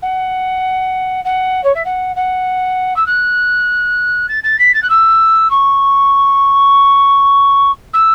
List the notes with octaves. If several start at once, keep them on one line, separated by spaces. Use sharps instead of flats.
F#5
F#5
C#5
E5
F#5
F#5
E6
F#6
A6
A6
B6
A6
F#6
E6
C#6
E6